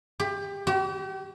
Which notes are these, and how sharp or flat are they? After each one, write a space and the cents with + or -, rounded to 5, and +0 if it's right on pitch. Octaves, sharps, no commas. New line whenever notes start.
G4 +25
G4 -40